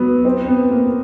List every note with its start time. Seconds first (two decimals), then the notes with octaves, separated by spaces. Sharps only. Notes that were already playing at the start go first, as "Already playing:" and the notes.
Already playing: F#3 B3
0.25 C4
0.48 B3
0.71 A#3